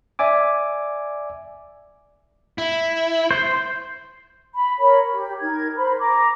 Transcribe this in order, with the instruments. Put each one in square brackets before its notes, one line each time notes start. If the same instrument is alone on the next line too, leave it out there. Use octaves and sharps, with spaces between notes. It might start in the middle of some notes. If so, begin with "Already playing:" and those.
[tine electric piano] D5 E5 G#5 D6
[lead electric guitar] E4
[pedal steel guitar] C5
[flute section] B5
A#4 C#5 B5
G4
D#4 A#4 G#6
A#4 C5 B5
A#5 D6